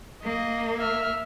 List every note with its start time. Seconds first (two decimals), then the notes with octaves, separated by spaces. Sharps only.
0.24 A#3 D#5
0.78 E5 F6